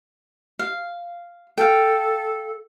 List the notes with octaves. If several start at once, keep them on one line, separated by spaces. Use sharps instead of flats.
F5
A4 F5 G5